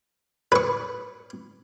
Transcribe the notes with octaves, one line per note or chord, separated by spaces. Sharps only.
B4 C#6